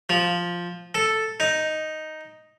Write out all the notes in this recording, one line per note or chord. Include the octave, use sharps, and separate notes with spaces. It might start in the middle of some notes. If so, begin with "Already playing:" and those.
F3
A4
D#4